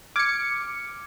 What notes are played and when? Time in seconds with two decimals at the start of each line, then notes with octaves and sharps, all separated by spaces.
0.16 D6 F6 G#6 C#7